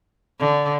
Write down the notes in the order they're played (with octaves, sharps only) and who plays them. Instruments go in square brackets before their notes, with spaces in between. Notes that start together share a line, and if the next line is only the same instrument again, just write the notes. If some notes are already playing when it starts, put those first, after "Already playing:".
[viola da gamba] D3